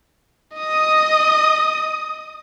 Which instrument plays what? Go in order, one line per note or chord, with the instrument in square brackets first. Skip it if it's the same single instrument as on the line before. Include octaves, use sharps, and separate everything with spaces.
[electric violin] D#5 D#6